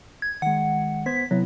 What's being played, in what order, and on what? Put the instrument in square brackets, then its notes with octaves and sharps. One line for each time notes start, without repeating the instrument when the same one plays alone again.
[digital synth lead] G#6
[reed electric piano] D#3 G#3 [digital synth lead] F#5
[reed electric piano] B3 C5 G#6 [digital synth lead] B6
[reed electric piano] C3 B3 E4 [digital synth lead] F#3